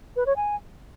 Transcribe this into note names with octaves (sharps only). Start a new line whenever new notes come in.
B4
C#5
G#5